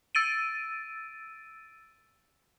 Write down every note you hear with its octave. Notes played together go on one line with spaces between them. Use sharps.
E6 A6 D7 D#7